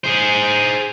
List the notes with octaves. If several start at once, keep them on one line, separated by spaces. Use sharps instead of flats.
G#4 C5